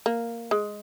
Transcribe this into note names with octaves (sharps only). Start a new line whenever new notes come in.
A#3
G#3